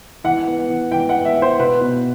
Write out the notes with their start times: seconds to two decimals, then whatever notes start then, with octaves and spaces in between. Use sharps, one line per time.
0.24 E3 F#5
0.47 B3
0.70 E3
0.91 E3 G5
1.09 F#5
1.15 B3
1.25 E5
1.36 B3
1.42 C5
1.59 B2 B4
1.81 B2